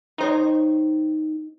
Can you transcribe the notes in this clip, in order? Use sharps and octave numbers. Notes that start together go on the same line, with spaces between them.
D#3 D#4 C5 C#5